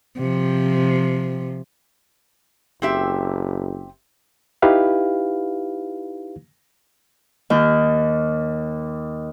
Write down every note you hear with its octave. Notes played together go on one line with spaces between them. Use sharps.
C3 F3
F#1 C4 G4 E5
D#4 E4 G4 B4 F5
D#2 D#5 G6